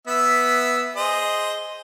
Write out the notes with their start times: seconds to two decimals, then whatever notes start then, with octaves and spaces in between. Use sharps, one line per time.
0.07 B3 E5 E6
0.96 G#4 C5 D#5